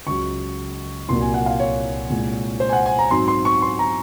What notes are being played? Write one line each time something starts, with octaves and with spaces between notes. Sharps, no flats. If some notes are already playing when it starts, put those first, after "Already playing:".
C#2 C#3 F#3 C#6
C2 A#2 F#3 A#3 C6
G#5
F#5
F5
C#5
C2 A#2 G#3
C5
G#5
F#5
G#5
A#5
G#2 F#3 C4 C6
C6
C#6
C6
A#5